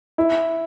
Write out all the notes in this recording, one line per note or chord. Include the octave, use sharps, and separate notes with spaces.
E4